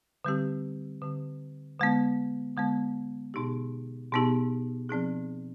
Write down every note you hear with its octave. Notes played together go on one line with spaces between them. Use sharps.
D3 G3 C4 G4
D3 G3 C4 G4
D3 G#3 B3
D3 G#3 B3
B2 B3 D#4 G4
B2 B3 D#4 G4
F3 C4 D#4 G#4